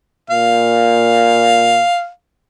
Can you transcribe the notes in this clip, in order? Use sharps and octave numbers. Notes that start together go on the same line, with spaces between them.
A#2 F5